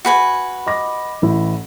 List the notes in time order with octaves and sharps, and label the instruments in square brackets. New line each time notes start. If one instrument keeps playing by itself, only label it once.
[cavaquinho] F#4 B4 G#5
[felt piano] D#5 D6 A#6
A1 E4